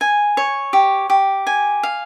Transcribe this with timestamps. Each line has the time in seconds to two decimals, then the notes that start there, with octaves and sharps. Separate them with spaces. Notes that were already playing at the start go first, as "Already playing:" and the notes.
0.01 G#5
0.37 C#5
0.73 G4
1.10 G4
1.47 G#5
1.83 F5